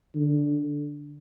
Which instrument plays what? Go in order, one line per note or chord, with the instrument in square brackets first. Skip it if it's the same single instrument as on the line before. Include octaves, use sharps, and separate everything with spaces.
[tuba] D3